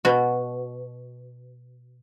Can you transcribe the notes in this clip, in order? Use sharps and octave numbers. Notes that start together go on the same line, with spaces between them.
B2 F#4